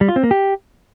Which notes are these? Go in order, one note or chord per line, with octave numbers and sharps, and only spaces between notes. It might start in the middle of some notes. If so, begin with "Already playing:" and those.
G3
F4
C4
A#3
G4